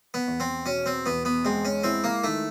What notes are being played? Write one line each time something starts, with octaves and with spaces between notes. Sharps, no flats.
B3
E2
C4
B2 C#4
C4
E2 B3
B3
G#3 C4
C#4
C4 E4
A#3
D#3 A3